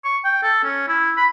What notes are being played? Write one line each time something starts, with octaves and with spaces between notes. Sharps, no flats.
C#6
G5
A4
C#4
E4
B5